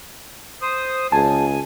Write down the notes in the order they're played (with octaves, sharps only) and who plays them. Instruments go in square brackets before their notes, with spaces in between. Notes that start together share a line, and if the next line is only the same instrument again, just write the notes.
[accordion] C5 D#6
[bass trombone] C#2 [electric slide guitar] G#4 A5 [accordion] G#5